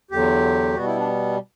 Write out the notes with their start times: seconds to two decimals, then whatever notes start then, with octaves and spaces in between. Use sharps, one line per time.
0.11 E2 D3 F#3 G4
0.74 B2 G3 B3 F#4
0.86 E4
0.96 D4